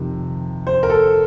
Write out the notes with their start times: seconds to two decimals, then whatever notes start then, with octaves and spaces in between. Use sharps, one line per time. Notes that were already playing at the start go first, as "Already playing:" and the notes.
Already playing: F2 C3 D#3
0.67 C5
0.83 A#4
0.90 A4